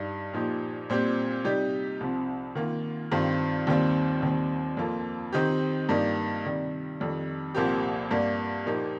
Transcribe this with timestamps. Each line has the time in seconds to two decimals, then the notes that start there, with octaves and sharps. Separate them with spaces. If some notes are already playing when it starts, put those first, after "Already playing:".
Already playing: G2 G3 D#4
0.33 A#2 F3 D#4 G4
0.90 A#2 G3 C4 G4
1.44 C3 G3 D#4 G4
2.00 C2 C3 F3
2.55 D#3 A#3 F4
3.11 G2 D#3 C4 F4
3.67 D#2 D#3 G3 C4 F4
4.22 D#2 D#3 G3 C4
4.77 F2 F3 A#3 F4
5.33 D#3 C4 D#4 G4
5.89 G2 G3 A#3 D#4 G4
6.45 C3 D#3 G3
7.00 F2 D#3 G3
7.55 C2 A#2 F3 A#3 G4
8.11 G2 G3 A#3
8.66 A#2 F3 A#3 D#4 G4